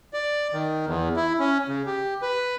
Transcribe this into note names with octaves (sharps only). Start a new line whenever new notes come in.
D5
D#3
E2
E4
C#4
C#3
G4
B4